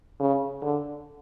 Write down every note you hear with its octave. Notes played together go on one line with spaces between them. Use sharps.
C#3
D3